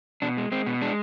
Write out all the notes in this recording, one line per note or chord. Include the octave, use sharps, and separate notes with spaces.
B2 D4
G#3
G#3 C4
B2
G#3 D4